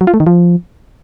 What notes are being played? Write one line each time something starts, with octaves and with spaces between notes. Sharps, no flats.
F#3
F4
A3
D#3
F3